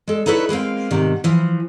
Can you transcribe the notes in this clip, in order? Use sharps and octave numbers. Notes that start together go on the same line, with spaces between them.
G#3 A4
D#4 E4 A4 B4 C#5
G#3 A#3 C4 F5
G#2 C3 D#3
E3 F3